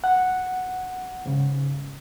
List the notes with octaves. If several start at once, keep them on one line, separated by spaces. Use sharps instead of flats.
F#5
G#2 C#3